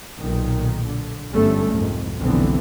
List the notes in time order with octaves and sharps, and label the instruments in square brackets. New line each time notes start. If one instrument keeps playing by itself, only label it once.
[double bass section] B1 A#2 D#3
D3
G1 G#2 G3 A3 C#4
C2 F2 G#2
F1 B1 D3 E3 B3 C4